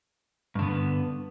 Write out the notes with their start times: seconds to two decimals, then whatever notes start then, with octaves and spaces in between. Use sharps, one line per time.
0.55 G2
0.59 D3
0.63 B3